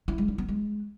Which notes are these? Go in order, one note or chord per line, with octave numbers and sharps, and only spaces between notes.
E4
G#3
D#4
B3
G#3